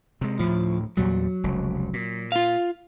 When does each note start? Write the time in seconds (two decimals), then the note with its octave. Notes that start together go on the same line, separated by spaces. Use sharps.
0.21 C3 G#3
0.39 D2 A2 F3
0.97 E2 A#2 F#3 G3
1.44 F1 C#2
1.93 A#2
2.32 F4 F5